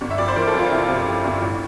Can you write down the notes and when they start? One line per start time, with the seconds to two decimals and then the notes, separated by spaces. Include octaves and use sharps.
0.01 G1
0.11 E5
0.18 F2 D5
0.28 C5
0.36 E3 A#4
0.47 A4
0.54 F2 F4
0.71 C3 E4
0.88 C3
1.06 F2
1.24 G1
1.41 A1